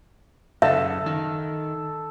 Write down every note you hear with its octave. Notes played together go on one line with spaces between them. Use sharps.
F#2 C#3 A4 E5
D#3